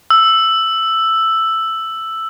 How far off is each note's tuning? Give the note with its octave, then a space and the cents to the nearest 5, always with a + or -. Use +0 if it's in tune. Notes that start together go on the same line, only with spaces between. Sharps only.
E6 +5